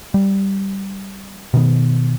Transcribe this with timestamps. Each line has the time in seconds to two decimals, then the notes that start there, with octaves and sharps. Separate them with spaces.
0.14 G3
1.54 B2 D#3 B3